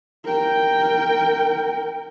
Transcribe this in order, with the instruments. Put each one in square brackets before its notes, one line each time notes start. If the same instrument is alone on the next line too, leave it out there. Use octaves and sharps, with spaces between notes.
[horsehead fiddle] A#4 G5